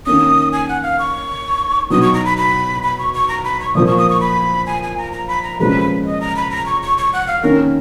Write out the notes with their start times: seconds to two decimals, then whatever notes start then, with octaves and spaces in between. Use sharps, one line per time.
0.06 D#3 A#3 C#4 D#6
0.53 G#5
0.69 F#5
0.83 F5
0.99 C#6
1.90 B2 F#3 B3 D#4 D#6
2.02 C#6
2.14 A#5
2.25 B5
2.37 B5
2.83 B5
2.99 C#6
3.14 C#6
3.28 A#5
3.44 B5
3.60 C#6
3.75 A#2 F3 A#3 D#6
3.87 C#6
3.98 D#6
4.10 C#6
4.20 B5
4.67 G#5
4.83 G#5
4.97 A#5
5.13 A#5
5.28 B5
5.43 A#5
5.60 A#2 F3 G#3 C#4 B4
6.05 D#5
6.21 A#5
6.36 B5
6.51 A#5
6.66 C#6
6.82 C#6
6.98 C#6
7.13 F#5
7.27 F5
7.43 D#3 A#3 C#4 A#4